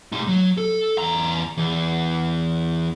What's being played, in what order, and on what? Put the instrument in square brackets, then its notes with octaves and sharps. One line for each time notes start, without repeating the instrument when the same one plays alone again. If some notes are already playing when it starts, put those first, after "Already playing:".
[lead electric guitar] A3 D#4
F#3
A4
E2 A#5
E2